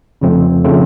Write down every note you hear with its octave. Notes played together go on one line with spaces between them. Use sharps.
F2 C#3 F3 A3 C4
C#3 F3 A3 C4